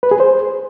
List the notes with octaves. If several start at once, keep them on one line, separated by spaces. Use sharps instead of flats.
B4
G#4
C5